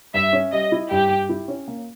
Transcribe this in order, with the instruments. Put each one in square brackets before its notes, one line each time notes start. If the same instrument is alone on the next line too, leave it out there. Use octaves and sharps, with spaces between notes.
[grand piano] G2 [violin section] E5
[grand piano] C#4
[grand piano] G3 [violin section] D#5
[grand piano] E4
[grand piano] G2 [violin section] G4
[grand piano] G2
E4
C#4
A#3